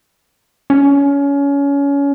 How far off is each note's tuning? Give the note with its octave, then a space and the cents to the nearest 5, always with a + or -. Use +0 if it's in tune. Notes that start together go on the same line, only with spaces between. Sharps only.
C#4 +25